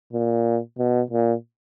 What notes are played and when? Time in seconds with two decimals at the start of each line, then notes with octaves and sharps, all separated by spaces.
0.13 A#2
0.78 B2
1.10 A#2